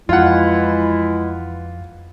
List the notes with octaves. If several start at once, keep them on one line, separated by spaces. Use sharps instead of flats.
F2 E3 G#3 E4 F4 F#5